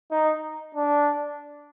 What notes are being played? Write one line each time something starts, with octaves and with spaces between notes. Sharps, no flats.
D#4
D4